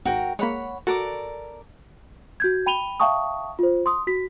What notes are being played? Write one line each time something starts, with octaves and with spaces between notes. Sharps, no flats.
G#1 G#2 F#4 A#4 G5
G#3 A#3 C#5 F#5 B5
F#4 A4 A#4 D5
F#4 G6 G#6
G5 B5 D#7 F7 G7
E5 F5 G5 A5 C#6 D#6
F4 C5
C6 D#6
F#4 B6